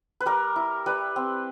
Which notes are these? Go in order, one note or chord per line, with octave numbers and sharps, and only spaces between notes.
B4
G3 A#4
E4
G3 B4
C4